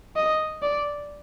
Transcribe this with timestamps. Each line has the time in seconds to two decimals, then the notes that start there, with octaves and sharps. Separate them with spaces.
0.16 D#5
0.62 D5